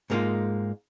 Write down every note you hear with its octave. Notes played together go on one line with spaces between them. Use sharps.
G#2 G#3 A#3 C#4 D#4 F4